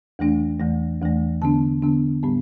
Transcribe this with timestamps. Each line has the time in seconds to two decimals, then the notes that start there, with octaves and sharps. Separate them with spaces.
0.19 E2 E3 A3 D4
0.60 E2 E3 A3
1.01 E2 E3 A3
1.42 D3 B3 D4 A5
1.82 D3 B3 D4
2.23 A2 G3 B3